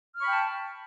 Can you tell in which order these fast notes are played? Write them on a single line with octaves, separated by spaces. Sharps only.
F6 C#6 B5 G5 A5